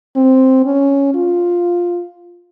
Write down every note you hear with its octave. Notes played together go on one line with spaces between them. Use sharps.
C4
C#4
F4